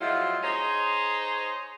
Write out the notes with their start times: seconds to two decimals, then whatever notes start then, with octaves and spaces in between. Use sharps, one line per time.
0.01 F3 F#3 G#3 E4 F4
0.43 D#4 G#4 C5 C#5